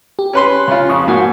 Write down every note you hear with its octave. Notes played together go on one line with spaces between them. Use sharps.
G4
C#4 B4 C6
C#3 F4
F2 C#6 D#6
G#2 A#3 F#4